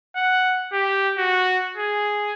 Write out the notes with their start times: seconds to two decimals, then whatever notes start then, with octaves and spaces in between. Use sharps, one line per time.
0.16 F#5
0.73 G4
1.18 F#4
1.77 G#4